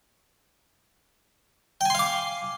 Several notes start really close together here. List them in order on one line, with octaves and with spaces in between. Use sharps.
G5 G#5 C6 F5 D6